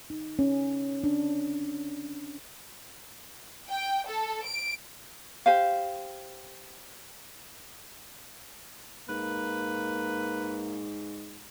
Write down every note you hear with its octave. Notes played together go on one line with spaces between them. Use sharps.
D#4
C#4
D4
G5
A4
D7
G4 C5 F5
G#2 A#3 B4